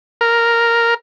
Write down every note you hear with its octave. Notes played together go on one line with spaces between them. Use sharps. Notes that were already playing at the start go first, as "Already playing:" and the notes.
A#4